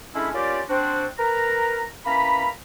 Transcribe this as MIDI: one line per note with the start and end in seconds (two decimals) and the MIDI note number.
0.14 0.29 56
0.14 0.29 57
0.14 0.29 61
0.14 0.29 62
0.14 0.29 64
0.34 0.61 58
0.34 0.61 61
0.34 0.61 65
0.34 0.61 67
0.34 0.61 74
0.69 1.06 60
0.69 1.06 62
0.69 1.06 66
0.69 1.06 72
1.18 1.87 70
1.18 1.87 71
1.18 1.87 82
2.06 2.48 52
2.06 2.48 58
2.06 2.48 61
2.06 2.48 82
2.06 2.48 83